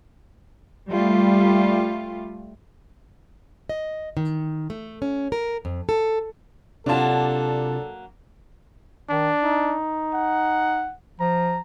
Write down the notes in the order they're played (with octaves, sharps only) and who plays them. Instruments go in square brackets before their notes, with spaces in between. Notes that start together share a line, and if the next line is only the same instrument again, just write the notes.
[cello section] G3 A3 F4
[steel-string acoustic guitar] D#5
D#3
A3
C#4
A#4
F2
A4
[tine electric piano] C3 F4 [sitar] F#3 A#3 [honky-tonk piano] D4 A5 [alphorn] A4
[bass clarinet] D#3 [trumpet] D4
[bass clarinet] D#4
[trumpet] F#5
[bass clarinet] F3 [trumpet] A#5